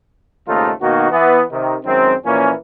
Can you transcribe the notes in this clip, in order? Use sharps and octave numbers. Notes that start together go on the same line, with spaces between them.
D#2 G#2 C#3 A3 D#4 F4
B2 D#3 A#3 D#4 F#4
E3 B3
C3 D#3
F#2 D#3 G#3 C4
A#2 E3 F3 A#3 C#4